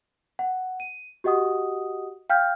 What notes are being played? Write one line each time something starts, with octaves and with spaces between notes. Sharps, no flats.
F#5
D#7
F#4 G4 D#5 F#5 D#6
F5 G5 F6 G6